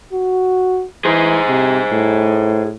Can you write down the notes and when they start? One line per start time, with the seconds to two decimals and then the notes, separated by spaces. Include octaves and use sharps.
0.13 F#4
1.05 E3 G#4 C5
1.48 C3
1.92 A2